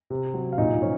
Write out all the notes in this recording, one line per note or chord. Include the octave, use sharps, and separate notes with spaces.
C3
F#3
F5
A#2 D#4 D#5
F3 C#4 C#5